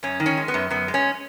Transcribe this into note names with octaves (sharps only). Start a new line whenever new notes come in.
F#2 C#4
D#3
C#4
G#3
B3
F#2
F#2 B3
G#3
C#4